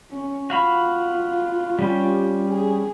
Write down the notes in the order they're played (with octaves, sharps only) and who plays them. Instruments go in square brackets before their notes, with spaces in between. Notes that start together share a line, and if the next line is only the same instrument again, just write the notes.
[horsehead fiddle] C#4
[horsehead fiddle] F4 [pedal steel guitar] F#4 F5 B5
[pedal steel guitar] G3 C#4 G4
[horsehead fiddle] G#4